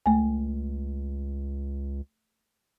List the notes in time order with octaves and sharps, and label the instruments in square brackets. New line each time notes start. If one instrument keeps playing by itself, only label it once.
[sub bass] C#2 [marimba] A3 G#5